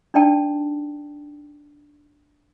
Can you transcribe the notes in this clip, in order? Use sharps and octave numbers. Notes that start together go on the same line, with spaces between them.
D4 D#4 D5 G5 A5